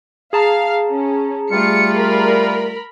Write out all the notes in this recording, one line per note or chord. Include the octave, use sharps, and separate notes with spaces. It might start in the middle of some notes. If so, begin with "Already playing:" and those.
G#4 F5 A5 A#5
C#4
G3 A3 F4 C#7
A#4 B5